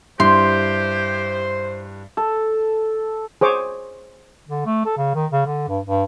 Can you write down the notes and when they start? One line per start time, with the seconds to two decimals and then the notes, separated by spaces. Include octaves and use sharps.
0.20 G2 E4 G4 C5 C6
2.17 A4
3.41 G#4 C5 C#5 D6
4.49 D3
4.65 A3
4.85 A4
4.97 C#3
5.15 D#3
5.32 C#3
5.46 D3
5.68 G2
5.86 G2